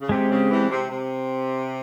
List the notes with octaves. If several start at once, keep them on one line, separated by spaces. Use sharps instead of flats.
C#3
C3 G#3 C4 G4
C#3
E2 E3
C3
C3